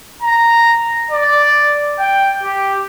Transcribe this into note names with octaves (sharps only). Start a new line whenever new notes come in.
A#5
D5
G5
G4